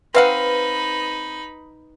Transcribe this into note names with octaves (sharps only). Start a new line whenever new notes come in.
C4 D#4 B4 F5 F#5 B5 E6